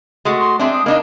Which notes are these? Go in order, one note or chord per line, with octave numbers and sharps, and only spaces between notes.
G#3 A3 F#4
C6
G#3 C4 D4 E5
D#6
A#3 D4 D#4 D#5